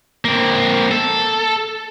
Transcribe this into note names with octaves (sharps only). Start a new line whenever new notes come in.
A#3 C4
A4